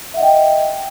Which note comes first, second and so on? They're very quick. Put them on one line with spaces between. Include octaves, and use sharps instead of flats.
E5 F#5 D#5 G5